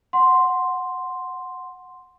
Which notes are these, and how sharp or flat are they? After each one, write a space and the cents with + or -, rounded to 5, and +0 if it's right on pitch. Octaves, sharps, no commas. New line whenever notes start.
F#5 -5 C6 +0